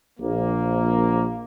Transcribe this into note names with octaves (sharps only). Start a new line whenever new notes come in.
A#1 A#3